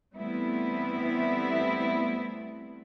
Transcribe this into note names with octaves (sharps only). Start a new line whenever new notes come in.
E3 G3 A3 B3 C4 E4